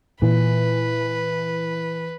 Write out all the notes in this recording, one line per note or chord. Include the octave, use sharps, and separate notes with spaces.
A#2 E3 B4